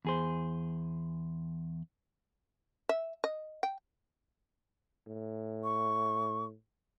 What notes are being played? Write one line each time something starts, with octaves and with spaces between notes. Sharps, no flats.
E2 G#4 C5
E5
D#5
G5
A2
C#6